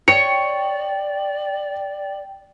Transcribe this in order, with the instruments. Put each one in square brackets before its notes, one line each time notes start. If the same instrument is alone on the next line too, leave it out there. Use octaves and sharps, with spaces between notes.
[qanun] C#5 [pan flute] D5 [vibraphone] G5 [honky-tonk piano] C#7